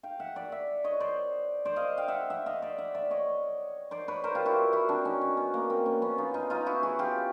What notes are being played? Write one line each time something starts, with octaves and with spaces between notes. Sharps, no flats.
F5 G5
E5 F#5
D5 E5
D5 E5
C#5 D#5
C5 D5
C5 D5
D#5 F5
F5 G5
E5 F#5
E5 F#5
D#5 F5
D5 E5
E5 F#5
D5 E5
C#5 D#5
C5 D5
B4 C#5
A#4 C5
F4 G4
E4 F#4
E4 F#4
C4 D4
C#4 D#4
C#4 D#4
B3 C#4
A#3
A#3 C4
B3 C#4
B3 C#4
D#4 F4
D#4 F4
D#4 F4
E4 F#4
F#4 G#4
F4 G4